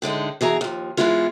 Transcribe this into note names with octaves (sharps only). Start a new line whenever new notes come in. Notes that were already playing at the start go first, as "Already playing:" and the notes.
A2 D3 G#3 D#4
B2 E3 G#4 A#5
D#2 F3
G#2 E3 G#3 B3 E4 F4